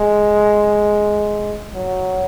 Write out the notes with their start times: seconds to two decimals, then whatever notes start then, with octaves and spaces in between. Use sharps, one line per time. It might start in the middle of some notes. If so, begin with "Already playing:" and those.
Already playing: G#3
1.74 F#3